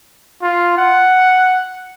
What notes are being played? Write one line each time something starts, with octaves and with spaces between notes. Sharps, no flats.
F4
F#5